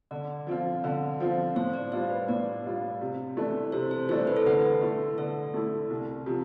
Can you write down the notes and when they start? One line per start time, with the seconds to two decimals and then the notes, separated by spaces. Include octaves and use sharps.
0.11 D3 D5
0.47 F3 C4 F4
0.84 D3
1.20 F3 C4 F4
1.56 A2 C5
1.74 D5
1.92 G3 D4 F4 C5
2.10 B4
2.28 A2 D5
2.64 G3 D4 F4
3.01 C3
3.37 E3 A3 D4
3.72 C3 C5
3.91 C5
4.09 E3 A3 D4 C5
4.27 B4
4.37 A4
4.46 D3 B4
4.81 A3 E4
5.18 D3 A4
5.54 A3 E4
5.90 C2
6.26 C3 F3